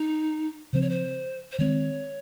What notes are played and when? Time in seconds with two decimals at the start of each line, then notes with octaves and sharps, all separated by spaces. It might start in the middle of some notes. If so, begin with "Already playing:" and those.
Already playing: D#4
0.73 C#3 F3 C4 C5
0.82 C#5
0.90 C5
1.52 C5
1.59 D#3 G#3 C4 C#5